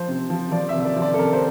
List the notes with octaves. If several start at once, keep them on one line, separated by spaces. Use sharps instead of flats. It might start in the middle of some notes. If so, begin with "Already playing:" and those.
Already playing: F3 C5
C3
F3
F3 D5
E5
C3
E5
D5
F3
D5
A4
C3 A#4
C5